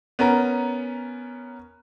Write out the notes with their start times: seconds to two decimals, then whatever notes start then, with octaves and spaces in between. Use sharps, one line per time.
0.19 B3 C#4 A#4 A#5